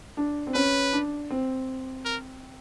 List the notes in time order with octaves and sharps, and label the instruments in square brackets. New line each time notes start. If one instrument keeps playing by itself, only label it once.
[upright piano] D4
C4
[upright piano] C#4 [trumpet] B4
[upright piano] D4
C4
[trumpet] A#4